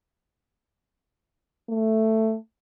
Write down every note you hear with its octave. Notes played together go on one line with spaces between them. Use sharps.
A3